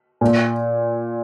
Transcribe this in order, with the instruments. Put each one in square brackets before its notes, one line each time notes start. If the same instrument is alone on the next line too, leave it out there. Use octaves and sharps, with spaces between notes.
[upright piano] A#2